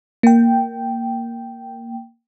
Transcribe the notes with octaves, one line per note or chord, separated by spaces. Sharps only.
A#3 G5